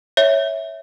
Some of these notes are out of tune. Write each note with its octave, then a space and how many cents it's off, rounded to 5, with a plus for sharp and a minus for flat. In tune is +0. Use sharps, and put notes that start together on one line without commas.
C#5 +0 E5 -15